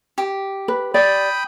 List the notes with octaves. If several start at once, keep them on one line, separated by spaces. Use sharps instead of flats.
G4
B4
D5 G5 B5 D#6